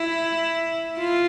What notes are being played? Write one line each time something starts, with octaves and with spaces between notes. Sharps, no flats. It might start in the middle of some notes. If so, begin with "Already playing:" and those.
Already playing: E4
F4